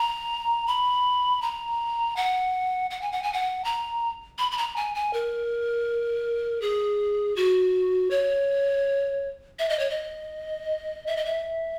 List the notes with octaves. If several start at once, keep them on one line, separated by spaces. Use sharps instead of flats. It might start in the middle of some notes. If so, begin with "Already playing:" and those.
Already playing: A#5
B5
A#5
F#5
F#5
G#5
F#5
G#5
F#5
A#5
B5
B5
A#5
G#5
G#5
A#4
G#4
F#4
C#5
E5
D#5
C#5
D#5
E5
D#5
E5